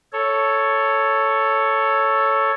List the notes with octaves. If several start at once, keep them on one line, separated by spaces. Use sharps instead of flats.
A4 C#5